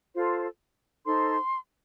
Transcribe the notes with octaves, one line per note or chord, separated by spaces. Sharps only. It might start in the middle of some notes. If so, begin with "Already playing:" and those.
F4 A4 C5
D#4 A4 C5 C6